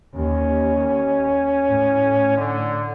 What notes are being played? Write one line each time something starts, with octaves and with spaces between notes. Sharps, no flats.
D#2 C#4
A2
D3